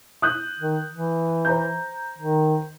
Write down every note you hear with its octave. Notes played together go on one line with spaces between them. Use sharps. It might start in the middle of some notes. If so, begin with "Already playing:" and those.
D#6 F#6 G6
D#3
E3
C5 A#5 G6
D#3